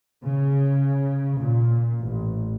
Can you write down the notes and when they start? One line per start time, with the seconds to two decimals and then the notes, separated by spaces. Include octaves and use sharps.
0.24 C#3
1.40 A#2
2.00 A1